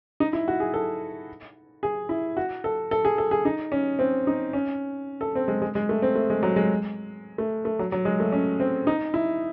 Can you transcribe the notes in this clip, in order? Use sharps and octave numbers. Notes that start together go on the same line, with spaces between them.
D#4
E4
F#4
G#4
A4
G#4
E4
F#4
A4
A4
G#4
A4
G#4
D#4
C#4
C4
D#4
C#4
A4
C4
G#3
G#3
G#3
A3
C4
A3
G#3
F#3
G#3
A3
A3
F#3
F#3
G#3
A3
C#4
C4
D#4
E4